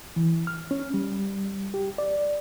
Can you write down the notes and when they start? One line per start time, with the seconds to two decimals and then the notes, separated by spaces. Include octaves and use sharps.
0.16 E3
0.47 F6
0.71 C#4
0.94 G3
1.74 G4
1.98 D5